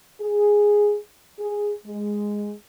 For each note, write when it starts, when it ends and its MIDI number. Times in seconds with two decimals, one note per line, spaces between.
0.21 0.96 68
1.39 1.74 68
1.86 2.54 56